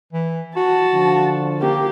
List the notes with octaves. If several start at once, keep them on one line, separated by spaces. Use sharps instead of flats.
E3
F#4 A5
D3 F3
A#3 G4